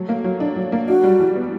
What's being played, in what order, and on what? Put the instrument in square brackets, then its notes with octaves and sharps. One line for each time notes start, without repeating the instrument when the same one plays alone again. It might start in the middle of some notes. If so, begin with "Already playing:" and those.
Already playing: [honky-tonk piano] F#3 A3
A#3
F#3
D4
F#3
A#3
[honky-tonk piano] D4 [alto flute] F#4
[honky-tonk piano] G3
E3
B3